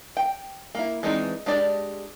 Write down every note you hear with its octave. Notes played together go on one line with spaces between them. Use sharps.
G5
A#3 E4
E3 G#3 C4 D4 D#4
G#3 D4 G4 D5